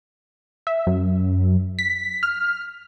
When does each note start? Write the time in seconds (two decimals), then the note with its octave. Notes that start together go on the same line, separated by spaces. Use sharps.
0.67 E5
0.87 F#2
1.79 B6
2.23 F6